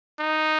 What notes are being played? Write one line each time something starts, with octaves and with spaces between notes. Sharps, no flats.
D#4